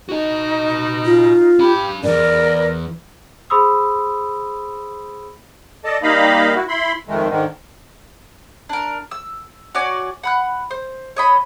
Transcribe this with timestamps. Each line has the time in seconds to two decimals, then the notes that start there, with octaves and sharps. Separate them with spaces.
0.09 D#4 F#4 D#5
1.05 F4
1.59 D4 G4 B5
2.04 E2 G2 A#4 D5
3.50 G#4 C5 B5 C6 D#6 E6
5.84 A4 D5 D#5 A5
6.03 G3 A#3 D#4 D#5 F5 B5
6.55 E4 F#4
6.68 E4 B5 C6
7.08 F2 D#3 G#3 A3
7.30 G#2 D3 D#3
8.69 D4 A#4
9.11 E6
9.75 F#4 C#5 D5 G#5
10.23 F#5 B5 F#6
10.71 C5
11.16 C#5 D#5 B5